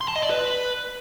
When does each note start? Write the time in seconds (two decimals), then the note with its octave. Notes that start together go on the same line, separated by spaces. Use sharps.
0.01 C6
0.08 A5
0.16 D#5
0.23 D5
0.30 B4